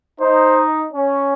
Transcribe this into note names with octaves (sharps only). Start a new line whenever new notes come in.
D#4 C5
C#4